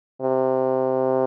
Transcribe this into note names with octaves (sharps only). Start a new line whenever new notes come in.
C3